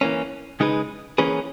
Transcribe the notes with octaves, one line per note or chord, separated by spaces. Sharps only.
E3 A#3 C#4
C#3 G#3 D#4 G#4 B4
E3 A#3 C#4 G#4 B4